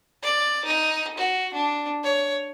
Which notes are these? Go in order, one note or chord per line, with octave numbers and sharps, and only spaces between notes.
D5
D#4
F#4
D4
C#5